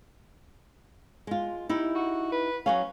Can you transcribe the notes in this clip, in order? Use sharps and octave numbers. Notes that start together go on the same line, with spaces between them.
G#3 F4
D#4 E4 G4
F#4
B4
F#3 C#4 C#5 F5